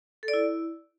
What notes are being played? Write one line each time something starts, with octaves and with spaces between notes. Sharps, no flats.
A4
D5
E4